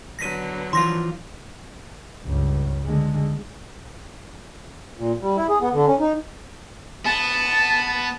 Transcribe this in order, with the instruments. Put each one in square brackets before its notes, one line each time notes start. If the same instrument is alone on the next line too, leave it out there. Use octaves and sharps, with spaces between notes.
[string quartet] D3 F#3 B3 [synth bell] A#6 B6 D#7
[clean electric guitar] E3 F3 F4 [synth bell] C6 A#6
[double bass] C#2 G2
D3 G#3
[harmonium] A#2
G3
E4
G#4
B3
D3
C#4
D#4
[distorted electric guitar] B3 [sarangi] A5